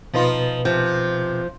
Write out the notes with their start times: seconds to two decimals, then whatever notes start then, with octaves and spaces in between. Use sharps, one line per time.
0.14 B2 F3 D#4 F4 B4
0.65 C3 F3